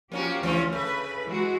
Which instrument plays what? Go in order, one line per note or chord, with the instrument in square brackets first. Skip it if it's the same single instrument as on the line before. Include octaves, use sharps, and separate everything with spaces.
[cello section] F3 G4 [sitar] A#3 C#4 F#4
[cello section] D2 [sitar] E3 F3 C#4
[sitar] C#3 A3 [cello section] B4
[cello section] E3 G#3 F#4